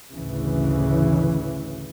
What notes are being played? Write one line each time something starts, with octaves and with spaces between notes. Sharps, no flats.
A1 D2 C#3 E3